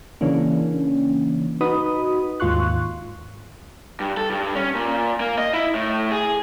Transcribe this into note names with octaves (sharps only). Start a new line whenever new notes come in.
C#3 E3 A#3 C#4 D4
D#4 F#4 B4 B5 D#6
D#2 G#2 F4 C6 C#6 F#6
G2
A4
G2
C#4
A#2
A#3
D#5
E4
A2
G#4